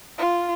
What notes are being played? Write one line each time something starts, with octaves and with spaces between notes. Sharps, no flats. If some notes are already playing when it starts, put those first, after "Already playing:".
F4